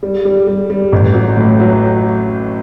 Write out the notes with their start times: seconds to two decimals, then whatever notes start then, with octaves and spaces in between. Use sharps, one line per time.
0.03 G3
0.25 G3
0.47 G3
0.70 G3
0.92 A1
1.14 F#3
1.37 A2
1.60 F#3